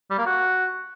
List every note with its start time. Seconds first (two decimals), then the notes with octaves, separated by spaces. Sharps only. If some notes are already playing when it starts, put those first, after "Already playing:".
0.10 G3
0.18 A#3
0.26 F#4